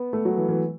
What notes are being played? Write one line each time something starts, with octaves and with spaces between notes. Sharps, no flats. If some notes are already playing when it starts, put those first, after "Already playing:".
Already playing: B3
A3
F#3
E3
E3